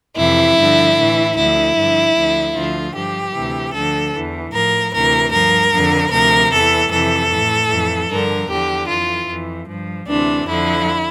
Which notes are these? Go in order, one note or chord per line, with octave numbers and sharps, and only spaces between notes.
F2 C3 E3 E4
G2 D3 F3
A2 E3
D2 D3 F3 E4
G2 D3 F3
D2 D3 F3
D2 D3 F3 F4
G2 F3 G4
D2 C3 E3
D2 D3 F3 A4
E2 E3
A2 F3 A#4
D2 C3 E3 A#4
G2 F3 A#4
F2 D3 F3
D2 C3 F3 A#4
E2 E3 A4
F2 C3 E3 A4
A2 E3
F2 E3
G2 D3 F3 A#4
E2 D3 F3 G4
F2 E3 F4
F2
E3
G2 F3
D2 C3 E3 D4
F2 D3 F3 E4